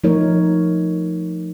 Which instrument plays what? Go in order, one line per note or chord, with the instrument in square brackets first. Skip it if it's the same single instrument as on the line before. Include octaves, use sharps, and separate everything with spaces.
[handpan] F3 A3 A#3 D#4 A#4 C#5